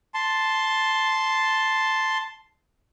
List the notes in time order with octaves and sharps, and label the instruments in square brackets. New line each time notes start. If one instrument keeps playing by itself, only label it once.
[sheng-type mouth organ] A5 C6